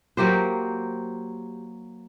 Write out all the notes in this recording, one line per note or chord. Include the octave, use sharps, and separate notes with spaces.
F#3 A#3 G4 C5